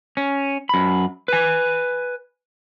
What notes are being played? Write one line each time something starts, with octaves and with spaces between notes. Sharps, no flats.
C#4
F#2 B5
B4 G#5